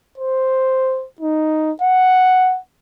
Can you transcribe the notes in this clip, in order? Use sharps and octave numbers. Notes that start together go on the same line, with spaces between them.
C5
D#4
F#5